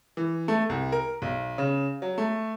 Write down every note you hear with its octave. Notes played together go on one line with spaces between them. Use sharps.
E3
A3
C2
A#4
B1
C#3
F#3
A3